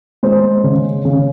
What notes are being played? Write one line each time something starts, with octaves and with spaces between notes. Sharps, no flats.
G#3 C5
C#3
C#3